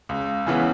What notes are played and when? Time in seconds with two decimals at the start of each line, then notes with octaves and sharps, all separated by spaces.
0.09 C#2
0.47 C#3 E3 B3